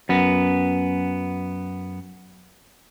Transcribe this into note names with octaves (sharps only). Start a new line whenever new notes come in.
F#2 B3